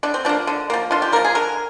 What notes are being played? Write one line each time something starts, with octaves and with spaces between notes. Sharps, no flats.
D3 D4
C4
F3 A#3 D4
D3
F3 A#3
D3 F4
G4
F3 A#3 A#4
G#4
D3 A#4